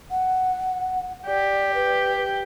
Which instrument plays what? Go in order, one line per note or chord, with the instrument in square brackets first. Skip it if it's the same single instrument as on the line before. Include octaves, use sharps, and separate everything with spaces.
[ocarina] F#5
[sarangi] G4 [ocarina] D5
[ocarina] B4